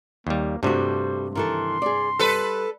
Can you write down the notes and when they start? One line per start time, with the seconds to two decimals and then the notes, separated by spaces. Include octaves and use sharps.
0.27 D#2 G3 A#3
0.63 G2 C3 G3 A3 F#4 C5
1.35 D#3 E3 A4 C6
1.82 G#4 D5
2.19 G3 A4 B4